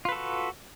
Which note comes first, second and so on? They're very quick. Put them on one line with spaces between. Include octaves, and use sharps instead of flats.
F4 B4 A4 F#4